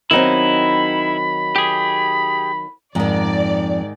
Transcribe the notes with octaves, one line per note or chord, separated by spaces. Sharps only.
D#3 F#3 C4 D#4 E4 B5
G4 G#4
F2 G#2 D#3 D5